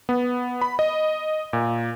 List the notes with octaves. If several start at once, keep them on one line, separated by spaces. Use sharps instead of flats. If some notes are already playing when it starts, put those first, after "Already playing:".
B3
B5
D#5
A#2